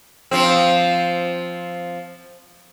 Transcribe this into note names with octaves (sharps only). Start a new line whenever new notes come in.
F3 C4